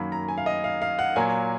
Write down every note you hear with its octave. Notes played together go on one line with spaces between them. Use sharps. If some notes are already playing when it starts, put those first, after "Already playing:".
Already playing: F#2 D#3 F#3 A#3 B5
A#5
G#5
F5
D#5
F5
F5
F#5
A#2 F#3 A#3 G#5